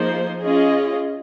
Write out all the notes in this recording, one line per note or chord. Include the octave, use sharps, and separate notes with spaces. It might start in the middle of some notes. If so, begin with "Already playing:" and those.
Already playing: F3 A#3 D#4 G#4 C5
C#4 F4 G#4 D#5